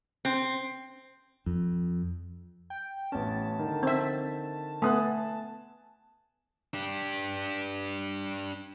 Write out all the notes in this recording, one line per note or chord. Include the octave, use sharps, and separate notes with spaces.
C4
F2
G5
A1 B3 C#4 A5
D3 D#3
C4 E5
A3 B3 G#5 D#6 F#6
D4 G4